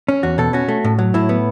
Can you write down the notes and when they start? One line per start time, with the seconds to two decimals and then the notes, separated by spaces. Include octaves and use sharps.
0.08 C#4
0.23 E2 F#4
0.38 B2 A4
0.53 C#4 F#4
0.68 A3
0.84 A2
0.99 F#3
1.14 A2 E4
1.29 B3